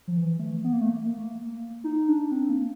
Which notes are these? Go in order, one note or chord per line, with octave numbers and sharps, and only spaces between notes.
F3
E3
A3
B3
A#3
A3
A#3
D#4
D4
C4
A#3